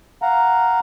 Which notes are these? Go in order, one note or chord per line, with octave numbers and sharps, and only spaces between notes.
F5 F#5 A#5